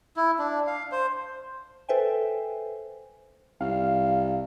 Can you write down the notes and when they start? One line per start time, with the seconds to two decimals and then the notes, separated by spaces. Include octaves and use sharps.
0.17 E4
0.39 D4
0.67 F5
0.92 C5
1.89 A4 B4 C5 E5 G5 G#5
3.61 C2 F5